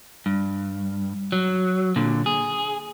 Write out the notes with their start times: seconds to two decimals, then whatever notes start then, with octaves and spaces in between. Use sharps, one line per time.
0.26 G2
1.32 F#3
1.96 A#2 D3
2.26 G#4